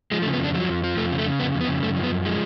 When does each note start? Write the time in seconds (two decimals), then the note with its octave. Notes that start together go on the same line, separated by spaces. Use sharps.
0.12 F3 G#3
0.22 A3
0.26 C#3
0.33 B3
0.40 F2 D4
0.55 F3 F#3
0.69 F2
0.84 F3
0.97 F2 A3
1.11 C#3
1.18 A3
1.26 C#3
1.39 F2 B3
1.54 F2
1.61 B3
1.68 C#3
1.83 F#2 A3
1.97 F3
2.03 B3
2.10 F#2
2.25 F3 G#3